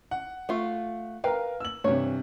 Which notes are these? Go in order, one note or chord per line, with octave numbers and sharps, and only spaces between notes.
F#5
A3 F4
A#4 B4 F5 G5 A#5
E6 F#7
G2 C3 E3 C#5